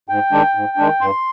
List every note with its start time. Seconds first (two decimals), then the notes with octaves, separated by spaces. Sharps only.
0.09 G#2 G5
0.32 D#3 G#3 D4
0.55 G#2
0.77 D#3 G#3 D4
1.01 G2 C6